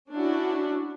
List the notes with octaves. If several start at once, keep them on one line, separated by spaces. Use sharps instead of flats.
C#4 D4 E4 F#4